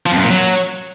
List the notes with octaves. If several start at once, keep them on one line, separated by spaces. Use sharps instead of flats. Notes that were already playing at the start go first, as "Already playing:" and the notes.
F3
F2
F#2
A#2
F#3